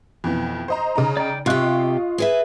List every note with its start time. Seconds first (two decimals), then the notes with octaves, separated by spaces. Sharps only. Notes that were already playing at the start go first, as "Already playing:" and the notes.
0.24 F2 B2 E3
0.68 C5 D#5 A#5
0.96 C#3 D#4 A#5
1.17 D5 G5
1.46 C3 F4 G4 D#5 F5 C#6 F#6
2.18 G#4 B4 E5